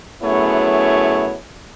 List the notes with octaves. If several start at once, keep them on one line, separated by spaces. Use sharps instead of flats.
F#2 A3 B3 E4 G#4 C#5